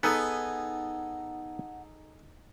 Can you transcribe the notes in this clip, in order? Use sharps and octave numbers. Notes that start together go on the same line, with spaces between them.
B3 D#4 G#4 A4 B4 F#5 G#5